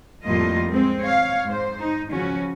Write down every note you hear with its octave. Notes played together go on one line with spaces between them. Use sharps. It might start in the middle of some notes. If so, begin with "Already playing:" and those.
F2 A2 G3 A#3 F4 D#5
G#3 C4
C#5 F5
G#2 C5
D#4
C#3 F3 C#4 F#4